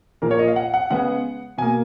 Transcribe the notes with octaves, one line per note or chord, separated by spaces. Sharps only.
A#2 F3 A#3 A#4
C#5
D#5
F5
F#5
F#5
C#3 G#3 B3 F#5
B2 A#3 G#5